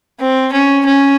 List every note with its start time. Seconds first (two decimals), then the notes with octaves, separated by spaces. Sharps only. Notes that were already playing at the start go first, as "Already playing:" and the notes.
0.20 C4
0.52 C#4
0.86 C#4